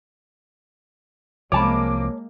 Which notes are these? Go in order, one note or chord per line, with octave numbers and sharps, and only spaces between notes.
C2 F3 G#3 A#3 C#5 A5 B5 D6